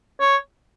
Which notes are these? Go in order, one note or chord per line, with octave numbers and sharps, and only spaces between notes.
C#5